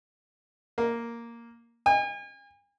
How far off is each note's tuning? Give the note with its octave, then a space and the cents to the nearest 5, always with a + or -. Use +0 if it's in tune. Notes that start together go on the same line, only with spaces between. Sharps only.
A#3 +0
G#5 -40